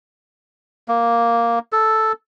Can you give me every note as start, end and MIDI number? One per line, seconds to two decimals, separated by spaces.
0.88 1.59 58
1.72 2.12 69